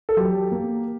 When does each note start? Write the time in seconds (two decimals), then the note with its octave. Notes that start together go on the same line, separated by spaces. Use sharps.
0.09 A4
0.17 F#3 G4
0.52 A#3